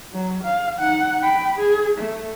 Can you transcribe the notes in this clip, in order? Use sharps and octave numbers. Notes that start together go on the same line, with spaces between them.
F#3
F5
D#4 F#5
G5 B5
G#4
A3